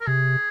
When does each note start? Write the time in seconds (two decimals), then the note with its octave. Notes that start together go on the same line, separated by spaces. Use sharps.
0.01 A#4
0.07 C3 G#4